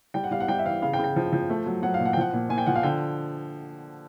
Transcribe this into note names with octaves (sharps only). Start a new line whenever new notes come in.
G3 G5
F#5
G3 F5
F#5
G3 G5
E5
E3 F5
C#3 F5
G5
C#3
G5
F3
F3
A3
F#3
F#3 F#5
F5
A#2
F#5
G5
F3 F#5
A#2
A#2 G#5
G5
F3 F#5
F5
D3 G5